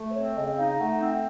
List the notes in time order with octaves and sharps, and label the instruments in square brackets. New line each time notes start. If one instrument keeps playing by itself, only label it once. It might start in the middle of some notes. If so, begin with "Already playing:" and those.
Already playing: [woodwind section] A3
[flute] C5
[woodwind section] C4 [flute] C#5
[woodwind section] C#3 [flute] D#5
[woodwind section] D#4 [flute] F5
[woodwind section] A3 [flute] F#5
[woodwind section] C4 [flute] F#5